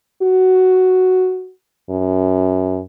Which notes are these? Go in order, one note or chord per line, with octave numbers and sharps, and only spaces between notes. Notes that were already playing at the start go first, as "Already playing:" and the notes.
F#4
F#2